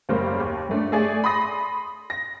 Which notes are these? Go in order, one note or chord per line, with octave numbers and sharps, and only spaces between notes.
F#1 C#3 G3 A#3 C5
D#2
G1 A3 D4
A3 G#4 D5 G#5
B5 C6 D#6 A#6
A#6